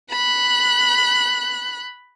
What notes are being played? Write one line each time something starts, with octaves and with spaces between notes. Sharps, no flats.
B5 F#6